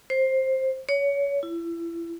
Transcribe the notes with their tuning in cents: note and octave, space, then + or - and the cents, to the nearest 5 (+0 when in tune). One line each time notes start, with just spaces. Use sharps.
C5 +10
C#5 +25
E4 +30